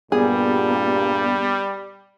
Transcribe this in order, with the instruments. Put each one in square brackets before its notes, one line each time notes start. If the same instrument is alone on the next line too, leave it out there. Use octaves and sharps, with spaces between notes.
[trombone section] G2 A#2 [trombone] G3 [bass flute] B3 [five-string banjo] G#4